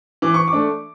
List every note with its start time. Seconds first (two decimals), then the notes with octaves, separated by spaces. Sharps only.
0.22 E3 D6
0.34 C#6
0.48 D6
0.53 A3 D4